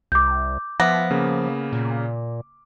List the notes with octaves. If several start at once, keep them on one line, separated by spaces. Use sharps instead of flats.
C2 D6 G6
F3 B3 E5 D6 A#6
C#3 A#3
A#2